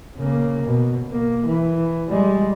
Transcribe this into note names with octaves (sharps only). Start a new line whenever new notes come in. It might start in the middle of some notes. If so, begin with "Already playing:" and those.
C#3 A#3
B2
A#3
E3
G3 G#3